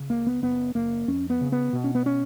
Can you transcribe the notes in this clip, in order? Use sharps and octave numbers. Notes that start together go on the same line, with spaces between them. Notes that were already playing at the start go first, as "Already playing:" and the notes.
Already playing: C#3
C#2 A#3
B3
F#1 B3
F#1 A#3
F2 C#4
B3
C#3
B3
B2
C#4
B3
C#4